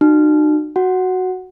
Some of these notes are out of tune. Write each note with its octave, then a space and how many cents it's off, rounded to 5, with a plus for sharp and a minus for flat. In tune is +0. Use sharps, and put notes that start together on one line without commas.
D#4 -45 F#4 +0
F#4 +0 F#5 +0